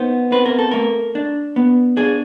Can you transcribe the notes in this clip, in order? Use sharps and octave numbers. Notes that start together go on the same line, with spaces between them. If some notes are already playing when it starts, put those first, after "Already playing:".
Already playing: B3 D#4 C5
C4 B4
A#4
A4
A3 A#4
D4
B3
D4 G#4